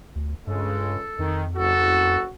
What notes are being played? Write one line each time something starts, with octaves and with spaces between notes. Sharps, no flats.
D2
C#2 G2 C#3 G#3 A4
F2 D#3
F#1 F#4 A4